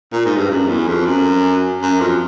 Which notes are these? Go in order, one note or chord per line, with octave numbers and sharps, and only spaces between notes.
A#2
G#2
G2
F#2
E2
F2
F#2
F#2
F2